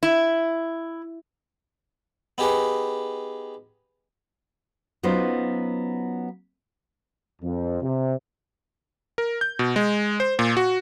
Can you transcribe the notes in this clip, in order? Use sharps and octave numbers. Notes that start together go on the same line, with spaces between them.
E4
B3 D#4 G4 G#4 B4
F#3 B3 C#4 D#4 F4 C5
F2
C3
A#4
G6
B2
G#3
C5
A#2
F#4